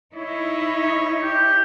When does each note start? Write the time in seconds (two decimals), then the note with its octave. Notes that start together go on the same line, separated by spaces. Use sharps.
0.15 D#4 E4 C#5 D#5
1.23 G4